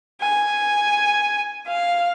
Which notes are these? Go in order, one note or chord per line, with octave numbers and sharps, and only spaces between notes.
G#5
F5